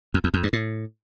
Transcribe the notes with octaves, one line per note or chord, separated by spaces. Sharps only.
F2
E2
F2
G2
A2